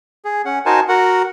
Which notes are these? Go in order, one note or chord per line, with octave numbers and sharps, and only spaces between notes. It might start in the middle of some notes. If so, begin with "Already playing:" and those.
G#4
C#4 F#5
D#4 F#4 A#4 C5 G#5 A5
F#4 A#4 F#5